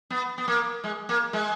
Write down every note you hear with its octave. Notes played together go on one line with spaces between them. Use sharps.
B3
B3
A#3
G#3
A#3
G#3